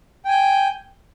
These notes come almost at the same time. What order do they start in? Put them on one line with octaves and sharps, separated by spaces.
G5 G#5 G6